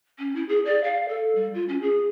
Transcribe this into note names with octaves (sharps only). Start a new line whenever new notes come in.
C#4
E4
G#4
D5
F5
A4
G3
F4
C#4
G#4